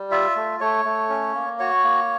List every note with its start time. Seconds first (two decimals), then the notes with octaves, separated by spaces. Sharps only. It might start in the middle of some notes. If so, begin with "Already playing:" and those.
Already playing: G3
0.11 F4 E5
0.36 A3
0.60 A3 C#5
0.85 A3
1.09 C#4
1.35 A#3
1.59 F#4 C#5
1.84 A#3